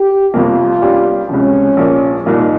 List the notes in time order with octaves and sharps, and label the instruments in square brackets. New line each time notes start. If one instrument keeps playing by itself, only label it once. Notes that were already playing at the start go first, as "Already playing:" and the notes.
Already playing: [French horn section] G4
[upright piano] G1 F2 C3 F3 A#3 [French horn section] F4
[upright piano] G2 G3 C#4 G4
[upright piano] C#2 C3 F3 [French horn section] C#4
[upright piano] A#1 A#2 F3 A#3
[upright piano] C2 A#2 F3 A#3 F4 [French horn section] D#4